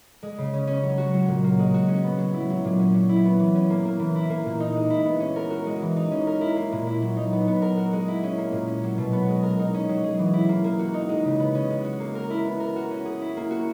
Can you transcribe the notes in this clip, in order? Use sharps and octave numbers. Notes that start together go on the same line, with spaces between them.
G#3
C#3
C#4
C#4
F#3
F#4
F#3
A#2
A#3
G#3
F#4
C#4
B3
F#3
E4
F#3
A#2
C#4
F#3
E4
B3
E3
C#4
A#3
A#3
E3
E4
A#3
A#2
D#4
G#3
E4
B3
C#4
A#4
F#4
G#3
E3
D#4
C#4
A#4
E4
A#3
A#2
E4
F#3
D#4
B3
B3
A#4
F#4
G#3
E4
C#4
A#3
A#2
C#4
F#3
B2
B3
G#3
A#4
D#4
C#4
F#3
G#4
E3
E4
A#3
A#3
F#4
D#4
G#3
C#3
B3
C#4
G#3
F#4
A#3
A#4
E4
B3
A#4
F#4
C#4
G#4
E4
A#3
F#4